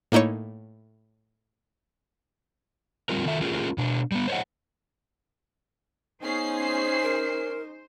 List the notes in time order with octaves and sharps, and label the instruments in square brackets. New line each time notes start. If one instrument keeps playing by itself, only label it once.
[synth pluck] A2 A#3 D#4 E4 C#5
[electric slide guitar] G3 C4 F4 A#4
D#3 F4 A4 E5
A3 C#4 F4 G4 G#4 A#4
B2 D4
G3 B3
C5 C#5 D#5 F#5
[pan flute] B3 [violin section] C#4 G#4 C7 [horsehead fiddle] D#4 [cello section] C5
[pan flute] A#4